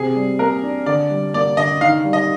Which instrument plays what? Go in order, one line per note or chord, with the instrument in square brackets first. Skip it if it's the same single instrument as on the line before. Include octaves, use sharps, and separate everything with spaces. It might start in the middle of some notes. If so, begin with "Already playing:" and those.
Already playing: [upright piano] C3 [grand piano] G#4
[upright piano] G3
[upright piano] A#3 [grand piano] A#4
[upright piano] D4
[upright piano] D3 [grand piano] D5
[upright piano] G3
[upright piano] A#3 [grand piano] D5
[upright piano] D3 [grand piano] D#5
[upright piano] D#3 [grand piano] F5
[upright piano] G3
[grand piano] D#5